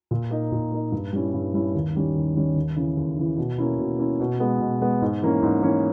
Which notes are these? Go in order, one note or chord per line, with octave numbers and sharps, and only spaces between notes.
A#2
A#3 D#4
A#2
A#3 D#4
G2
G3 C#4 E4
G2
G3 C#4 E4
D#2
D#3 G3 C#4
D#2
D#3 G3 C#4
D#2
C#3 E3
D#2
C#3 E3
B2
A#3 C#4 E4
B2
A#3 C#4 E4
B2
G#3 B3
B2
G#3 B3
G#2
E3 A#3 C#4
G#2
E3 A#3 C#4